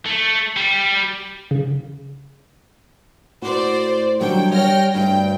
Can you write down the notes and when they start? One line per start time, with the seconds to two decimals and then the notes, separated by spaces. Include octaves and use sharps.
0.06 A3
0.56 G3
1.51 C#3
3.42 A2 F#4 C5 D5
4.21 D3 D#3 F#3 G3 G5
4.53 C#5 D#5 G5 F6 A#6
4.94 D2 G2 G5